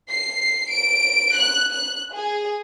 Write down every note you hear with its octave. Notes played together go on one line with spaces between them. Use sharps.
C7
D7
F#6
F#6
G#4